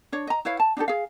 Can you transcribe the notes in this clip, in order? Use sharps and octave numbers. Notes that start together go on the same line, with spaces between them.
D4 C#5
D#5 A#5
E4 B4 C#5 F5
A5
D4 D#4 G4 A4
G#4 F5